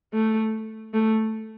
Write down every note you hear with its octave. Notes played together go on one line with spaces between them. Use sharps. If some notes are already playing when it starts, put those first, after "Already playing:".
A3
A3